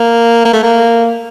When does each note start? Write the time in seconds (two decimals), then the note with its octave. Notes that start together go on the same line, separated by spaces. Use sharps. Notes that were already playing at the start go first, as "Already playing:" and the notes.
Already playing: A#3
0.45 A#3
0.53 A3
0.63 A#3